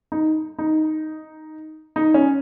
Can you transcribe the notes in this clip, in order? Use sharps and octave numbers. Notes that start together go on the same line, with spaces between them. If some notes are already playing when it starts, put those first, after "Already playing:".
D#4
D#4
D#4
C#4